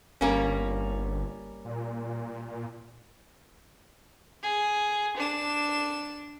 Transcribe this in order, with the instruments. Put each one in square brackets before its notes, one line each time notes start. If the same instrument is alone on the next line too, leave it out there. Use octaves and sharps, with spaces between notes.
[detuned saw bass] G1 [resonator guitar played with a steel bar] G3 A#3 C#4
[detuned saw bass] A#2
[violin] G#4
D4 E7